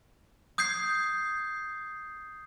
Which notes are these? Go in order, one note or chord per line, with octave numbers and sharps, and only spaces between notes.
D#6 G6 G#6 C7